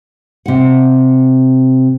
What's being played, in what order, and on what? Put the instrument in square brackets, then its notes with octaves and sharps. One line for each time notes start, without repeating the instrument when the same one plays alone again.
[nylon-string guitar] C3 F#5